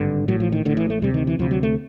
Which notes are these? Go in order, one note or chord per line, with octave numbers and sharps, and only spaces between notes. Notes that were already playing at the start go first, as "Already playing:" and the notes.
Already playing: G#1 G2 D3
A1 A2 F#3
F3
D#3
A1 A2 D3
E3
A3
D2 C3 G3
D#3
E3
D2 C3 F3
F#3
A3